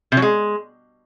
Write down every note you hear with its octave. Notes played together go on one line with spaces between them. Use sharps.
C3
F#3
G#3